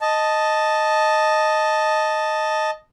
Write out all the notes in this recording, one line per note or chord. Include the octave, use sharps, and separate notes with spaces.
D#5 A5